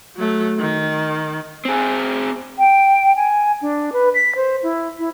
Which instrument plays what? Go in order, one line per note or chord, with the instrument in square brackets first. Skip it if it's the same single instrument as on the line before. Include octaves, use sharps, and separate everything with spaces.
[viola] F#3 A3
D#3
[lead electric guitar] C4 G#4
[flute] G5
G#5
D4
B4
B6
C5
E4
E4